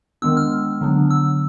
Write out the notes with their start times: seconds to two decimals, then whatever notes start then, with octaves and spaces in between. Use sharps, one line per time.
0.22 D#3 G#3 B3 D4 E6
0.37 F6
0.81 D3 F#3 B3 D4
1.11 E6